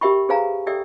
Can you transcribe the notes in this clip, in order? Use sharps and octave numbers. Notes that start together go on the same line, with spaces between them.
G4 A#4 E5 G5 B5 C#6
G#4 B4 C5 F5 G#5 A#5
G4 A4 D5 E5 G5 E6